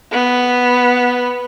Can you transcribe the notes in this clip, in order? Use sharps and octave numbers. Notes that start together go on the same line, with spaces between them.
B3